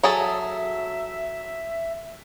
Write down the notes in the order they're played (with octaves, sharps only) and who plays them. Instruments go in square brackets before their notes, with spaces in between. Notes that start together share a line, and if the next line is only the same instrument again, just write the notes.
[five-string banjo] F#3 G#4 A4 [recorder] E5